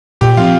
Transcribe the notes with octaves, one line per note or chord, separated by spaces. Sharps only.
A#2 G4
F3 C4 F4